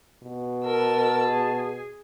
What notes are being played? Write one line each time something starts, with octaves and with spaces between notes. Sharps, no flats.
B2
A#4 B4 A5 E6
G#4